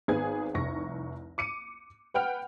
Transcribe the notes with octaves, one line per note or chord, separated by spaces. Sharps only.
G#1 B3 G#4 G#5 G#6
F1 C2 C#6 A#6
D6 C#7 D#7
B4 F#5 G5 F6